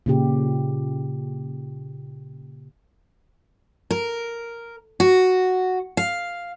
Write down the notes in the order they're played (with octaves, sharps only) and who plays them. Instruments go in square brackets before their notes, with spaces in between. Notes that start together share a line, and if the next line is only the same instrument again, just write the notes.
[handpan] A#2 C#3 G4
[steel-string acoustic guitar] A#4
F#4
F5